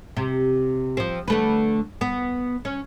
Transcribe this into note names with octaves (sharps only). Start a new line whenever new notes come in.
C3
F3 C4
D3 A3 B4
B3
C#4